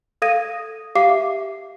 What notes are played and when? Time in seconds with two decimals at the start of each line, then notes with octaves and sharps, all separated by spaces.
0.22 A4 F5 D#6 G#6 A#6 D#7
0.95 G4 F5 D6 C7
1.09 E5